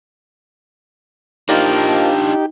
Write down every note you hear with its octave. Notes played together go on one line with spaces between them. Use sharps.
F3 A#3 D4 D#4 F4 G4